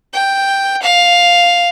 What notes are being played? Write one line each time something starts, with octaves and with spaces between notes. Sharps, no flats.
G5
F5